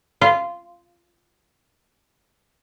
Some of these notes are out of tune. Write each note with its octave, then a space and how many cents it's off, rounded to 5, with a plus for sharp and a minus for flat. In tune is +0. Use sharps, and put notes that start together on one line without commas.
F4 -15